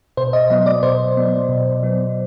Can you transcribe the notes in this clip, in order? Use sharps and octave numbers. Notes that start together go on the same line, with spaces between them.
B2 C5
D#5
F#3 B3 D#5
D5
B2 C5
F#3 B3
B2
F#3 B3